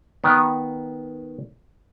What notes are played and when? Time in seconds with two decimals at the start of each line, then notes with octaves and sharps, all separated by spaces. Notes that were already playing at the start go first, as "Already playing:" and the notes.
0.24 D#3 B3